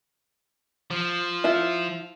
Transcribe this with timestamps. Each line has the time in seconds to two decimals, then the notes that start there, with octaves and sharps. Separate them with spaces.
0.91 F3
1.44 E4 F4